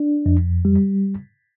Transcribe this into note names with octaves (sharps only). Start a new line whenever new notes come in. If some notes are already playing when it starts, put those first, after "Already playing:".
Already playing: D4
F2
G3